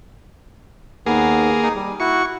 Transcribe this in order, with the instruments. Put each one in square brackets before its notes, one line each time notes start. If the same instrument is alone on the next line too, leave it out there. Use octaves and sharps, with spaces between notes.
[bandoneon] D#2 D#3 B3 [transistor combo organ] A#3 G#4
[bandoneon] D#4
G3
[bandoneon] E4 F#4 [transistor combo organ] C#6